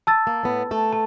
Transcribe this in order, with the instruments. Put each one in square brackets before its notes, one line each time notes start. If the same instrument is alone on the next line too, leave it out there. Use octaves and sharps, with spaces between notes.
[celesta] A5 E6 A6
[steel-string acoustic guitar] A#3
A2 B3
A3 A4
[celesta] A5